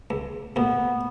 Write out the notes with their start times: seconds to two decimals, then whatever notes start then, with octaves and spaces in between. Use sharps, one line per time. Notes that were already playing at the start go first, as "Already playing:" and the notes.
0.10 C#2
0.56 D2 A#2 B3